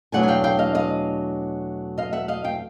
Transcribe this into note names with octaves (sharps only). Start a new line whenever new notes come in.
E2 B2 F#3 A3 D4 F#5 G#5
G#5
F5 G5
F5 G5
D#5 F5
D#5 F5
D#5 F5
E5 F#5
D#5 F5
F5 G5